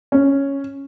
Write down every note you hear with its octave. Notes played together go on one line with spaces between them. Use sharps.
C#4